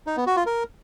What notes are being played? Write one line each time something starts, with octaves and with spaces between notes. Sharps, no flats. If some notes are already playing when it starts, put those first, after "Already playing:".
D#4
B3
F#4
F4
A#4